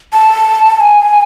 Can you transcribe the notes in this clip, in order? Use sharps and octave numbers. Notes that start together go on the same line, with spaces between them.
A5
A5
G#5